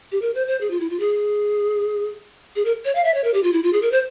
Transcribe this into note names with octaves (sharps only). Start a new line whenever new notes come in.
G4
A#4
C5
C5
G#4
F4
E4
F4
G#4
G#4
A#4
C#5
F5
E5
C#5
A#4
G4
F4
E4
F4
G#4
A#4
C5